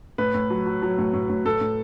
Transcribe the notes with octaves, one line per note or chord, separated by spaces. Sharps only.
A2 B4
A2
F#3
F#3
F#3
A2
A2
A2
A2 A4
A2